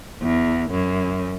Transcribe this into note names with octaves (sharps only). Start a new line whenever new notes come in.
E2
F#2